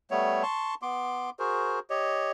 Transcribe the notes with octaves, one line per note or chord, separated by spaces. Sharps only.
G3 A3 B3 C#5
A5 C6 C#6
B3 C6 D6
F#4 G#4 A#4 C5
G4 C#5 D#5